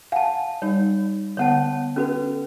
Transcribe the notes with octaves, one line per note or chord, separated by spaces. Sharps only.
F5 F#5 G#5 A5
G3 D#4 C#5
D3 B3 C#5 F#5 A5
C#4 F#4 A4 B4